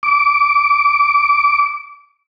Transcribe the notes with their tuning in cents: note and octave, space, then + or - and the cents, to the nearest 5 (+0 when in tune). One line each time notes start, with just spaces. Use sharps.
D6 -20